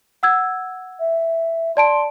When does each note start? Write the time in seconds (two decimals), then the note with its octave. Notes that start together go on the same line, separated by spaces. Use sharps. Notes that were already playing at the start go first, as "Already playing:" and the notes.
0.23 F#5 E6 G#6
1.00 E5
1.77 D5 A5 C6 D7